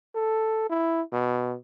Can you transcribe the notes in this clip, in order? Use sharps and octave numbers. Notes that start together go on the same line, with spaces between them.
A4
E4
B2